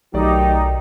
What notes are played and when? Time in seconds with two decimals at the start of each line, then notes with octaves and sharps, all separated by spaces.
0.14 B1 D#3 F#3 A3 D#4 G4 D5